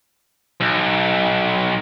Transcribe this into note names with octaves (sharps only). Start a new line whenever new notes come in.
B1